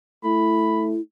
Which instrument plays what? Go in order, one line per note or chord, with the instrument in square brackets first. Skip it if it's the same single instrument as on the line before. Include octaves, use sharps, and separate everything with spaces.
[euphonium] A3 [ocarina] E4 [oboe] B5